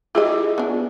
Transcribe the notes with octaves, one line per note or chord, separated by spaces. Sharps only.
E4 F4 G4 G#4 D#5
B3 D4